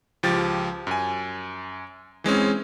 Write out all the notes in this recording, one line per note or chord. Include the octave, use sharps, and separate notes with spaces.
C#2 F3 G4 A6
F#2 G#5
E3 G#3 C4 C#4